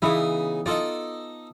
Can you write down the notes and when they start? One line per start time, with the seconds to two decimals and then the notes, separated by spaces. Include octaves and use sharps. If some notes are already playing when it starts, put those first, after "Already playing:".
0.02 C#3 E3 B3 D#4 E4
0.66 D#4 F4 A4 D5 D#5